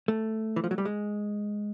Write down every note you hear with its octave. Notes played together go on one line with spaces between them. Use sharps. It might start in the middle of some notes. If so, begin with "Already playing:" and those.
A3
E3
F3
F#3
G3
G#3